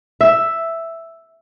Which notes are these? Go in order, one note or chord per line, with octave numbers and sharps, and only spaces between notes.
E5